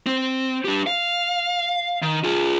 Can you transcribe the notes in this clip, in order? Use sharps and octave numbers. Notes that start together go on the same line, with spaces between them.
C4
D4 G4
F5
D#3
F4 G#4